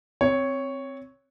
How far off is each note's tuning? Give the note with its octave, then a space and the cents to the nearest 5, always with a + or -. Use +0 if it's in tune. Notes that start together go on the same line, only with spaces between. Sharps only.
C4 +0 C#5 +0